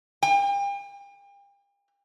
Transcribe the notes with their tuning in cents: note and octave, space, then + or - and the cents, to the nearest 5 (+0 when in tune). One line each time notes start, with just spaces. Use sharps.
G5 +40